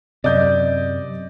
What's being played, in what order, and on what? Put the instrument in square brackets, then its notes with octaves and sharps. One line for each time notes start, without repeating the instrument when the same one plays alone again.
[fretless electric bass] F#2 C3 [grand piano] D5 D#5 G6